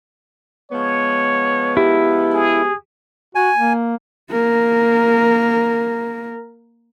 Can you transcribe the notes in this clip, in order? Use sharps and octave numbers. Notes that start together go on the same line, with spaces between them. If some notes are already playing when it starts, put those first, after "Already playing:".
F3 G#3 B3 C#5
E4 G4
G#4
F#4 G#5
A#3
A#3 A#4